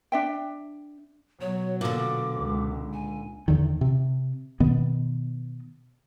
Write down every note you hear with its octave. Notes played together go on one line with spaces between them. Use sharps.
D4 E5 G5
B2 F#3 C#5
A#2 D3 D6
C#2
G#5
E2 D3 D#3
C3
B2 D#3 B3